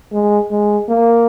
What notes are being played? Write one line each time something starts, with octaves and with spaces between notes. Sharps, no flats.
G#3
G#3
A#3